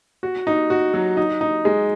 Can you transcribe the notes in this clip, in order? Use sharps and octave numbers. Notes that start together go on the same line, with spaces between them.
F#4
D#4
F#4
F#3
D#4
D#4
G#3